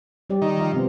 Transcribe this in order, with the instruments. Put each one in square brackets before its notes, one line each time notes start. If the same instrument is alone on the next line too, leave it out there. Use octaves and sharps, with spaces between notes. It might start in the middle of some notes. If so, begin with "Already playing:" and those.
[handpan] G3 G4 D5
[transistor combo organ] D#3
[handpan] F3 F5
C3 B3 C5